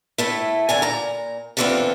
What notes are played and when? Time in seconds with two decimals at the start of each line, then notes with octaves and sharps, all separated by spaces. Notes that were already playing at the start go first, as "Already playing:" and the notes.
0.18 A2 A3 E4
0.69 D3 A3 G#5
0.82 A#2 A#5
1.57 A#2 D3 E3 B3 C4 F4